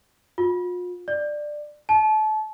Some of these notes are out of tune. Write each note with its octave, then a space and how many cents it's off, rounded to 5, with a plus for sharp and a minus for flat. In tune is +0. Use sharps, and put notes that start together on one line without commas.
F4 +40
D5 +15
A5 -30